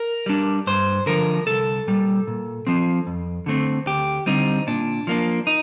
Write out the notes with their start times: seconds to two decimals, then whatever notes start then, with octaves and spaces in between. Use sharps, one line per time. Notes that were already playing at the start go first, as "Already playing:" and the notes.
Already playing: A#4
0.26 G3 D4
0.67 G2 C5
1.06 D3 F3 A#4
1.47 C2 A4
1.87 A#2 G3
2.27 A#2
2.67 F3 C4
3.07 F2
3.46 D3 A3 C4
3.86 D2 G4
4.26 D3 G3 C4 D#4
4.67 A#2 D4
5.07 F3 A#3 D4
5.47 D#4